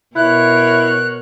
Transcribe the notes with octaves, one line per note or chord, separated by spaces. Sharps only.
B2 E4 A#4 C#5 F#6